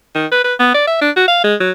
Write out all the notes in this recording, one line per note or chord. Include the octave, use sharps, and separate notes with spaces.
D#3
B4
B4
B3
D5
E5
D4
F#4
F5
G#3
F#3